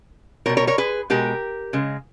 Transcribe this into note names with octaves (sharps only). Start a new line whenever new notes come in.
B2 G3 A#4 C#5
A#4 C#5
A#4 C#5
G#4 B4
B2 G#3 G4 A#4
C#3 G#3